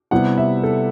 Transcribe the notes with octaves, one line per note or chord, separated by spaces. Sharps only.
C3 G3 B3 E4 F#5
E5
A4